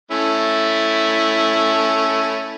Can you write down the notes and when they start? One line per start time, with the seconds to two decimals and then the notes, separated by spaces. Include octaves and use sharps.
0.11 A3 C#4 E4